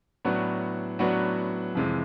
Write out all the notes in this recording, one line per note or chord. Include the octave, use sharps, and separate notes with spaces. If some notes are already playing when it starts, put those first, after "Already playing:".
A2 F#3 B3 D4 F#4
A2 F#3 B3 D4 F#4
F2 C3 E3 G#3